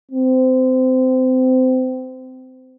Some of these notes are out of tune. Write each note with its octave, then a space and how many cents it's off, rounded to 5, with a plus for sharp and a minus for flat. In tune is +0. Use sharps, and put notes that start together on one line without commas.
C4 -25